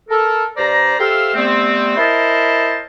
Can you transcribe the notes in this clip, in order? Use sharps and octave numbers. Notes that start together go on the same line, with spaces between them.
A4 A#4
G2 C5 D5 A#5
G4 A4 C5 E5 F5
G3 A3 B3 C4
E4 A#4 C5 D#5 A5 B5